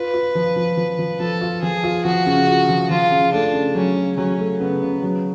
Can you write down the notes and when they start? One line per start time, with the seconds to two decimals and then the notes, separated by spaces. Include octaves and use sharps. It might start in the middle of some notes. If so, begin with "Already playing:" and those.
Already playing: F4 B4
0.14 F4
0.35 F3
0.56 F3
0.77 F3
0.99 F3
1.20 F3 A4
1.41 F4
1.62 F3 G#4
1.84 F4
2.05 F3 F#4
2.26 C#3
2.47 F4
2.69 F3
2.90 F3 F4
3.11 C#3
3.33 A3 D4
3.54 C#3
3.75 F#3 C#4
3.97 C#3
4.17 F#3 C#4
4.39 A3
4.60 C#3 B3
4.82 C#3
5.02 F#3